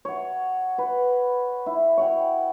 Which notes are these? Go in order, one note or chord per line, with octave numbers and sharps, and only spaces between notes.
C#5 F#5
B4
E4
C#5 F#5 G5